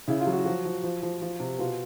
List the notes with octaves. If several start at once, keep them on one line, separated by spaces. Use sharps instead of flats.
C#3 E4
F4
F#3
F#4
F3 F#4
F3
F3
F3
F3
C3
B2 F4